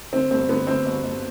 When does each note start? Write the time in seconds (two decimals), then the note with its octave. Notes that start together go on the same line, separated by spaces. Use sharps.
0.13 D3 C4
0.31 G1 C4
0.49 D3 B3
0.67 D3 C4
0.85 G1
1.04 G1